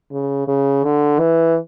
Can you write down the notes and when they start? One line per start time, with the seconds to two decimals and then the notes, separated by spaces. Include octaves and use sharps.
0.12 C#3
0.48 C#3
0.84 D3
1.19 E3